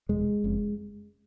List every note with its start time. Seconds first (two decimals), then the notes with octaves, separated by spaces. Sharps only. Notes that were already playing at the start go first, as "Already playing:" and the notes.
0.09 F1 E2 B2 G#3
0.44 F#1 F2 C#3